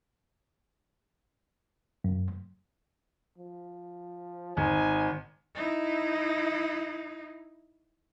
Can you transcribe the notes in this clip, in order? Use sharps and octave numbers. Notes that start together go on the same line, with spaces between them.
F#2
F3
G#1 D#4 G#5
D#4 E4